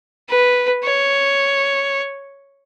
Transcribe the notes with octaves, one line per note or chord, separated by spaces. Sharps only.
B4
C#5